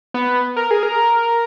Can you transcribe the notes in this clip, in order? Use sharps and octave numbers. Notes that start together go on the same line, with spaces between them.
B3
A#4
G#4
A#4